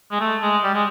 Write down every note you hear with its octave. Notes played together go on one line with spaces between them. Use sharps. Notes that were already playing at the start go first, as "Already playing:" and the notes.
G#3
A3
G#3
G3
G#3